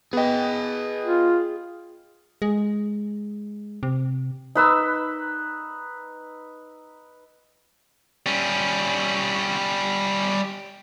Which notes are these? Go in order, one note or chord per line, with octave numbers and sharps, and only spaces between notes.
B3 G#4 D#5 G5
F4
G#3
C3
D#4 B4 E6
G3 C#4